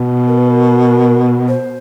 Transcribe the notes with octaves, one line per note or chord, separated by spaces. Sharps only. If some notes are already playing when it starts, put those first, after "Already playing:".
Already playing: B2
A#4
B4
A#4
C5